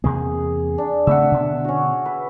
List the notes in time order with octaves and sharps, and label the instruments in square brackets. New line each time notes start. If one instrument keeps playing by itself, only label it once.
[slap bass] E2 C3 A#3 [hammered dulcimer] G#4
[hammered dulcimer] D4
[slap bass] C#3 A3 C4 [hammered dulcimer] E5 F#5
[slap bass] B2 D3 B3
[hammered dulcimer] C#4 F#4
B4